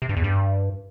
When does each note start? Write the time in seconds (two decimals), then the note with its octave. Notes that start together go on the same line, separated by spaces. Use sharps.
0.02 C3
0.09 G2
0.17 E2
0.24 G2